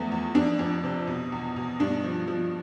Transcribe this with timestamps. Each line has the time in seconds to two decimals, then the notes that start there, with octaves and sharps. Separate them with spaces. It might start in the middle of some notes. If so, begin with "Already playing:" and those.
Already playing: E2 F3 A3 B3
0.12 E2
0.35 F2 D4
0.59 F2
0.83 C3
1.07 B2
1.32 E2
1.56 B2
1.80 G2 D4
2.04 F3
2.28 F3